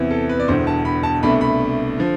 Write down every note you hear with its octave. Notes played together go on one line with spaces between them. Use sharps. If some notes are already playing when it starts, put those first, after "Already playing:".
Already playing: E2 C3 E3
A4
B4
D5
E1 E2 D3 C5
A5
B5
A5
C2 B2 A3 D4 B5
B5
D3 F3